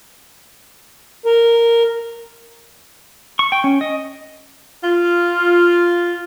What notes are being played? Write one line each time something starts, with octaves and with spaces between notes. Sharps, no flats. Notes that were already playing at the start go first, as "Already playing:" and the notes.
A#4
C#6
G5
C#4
D#5
F4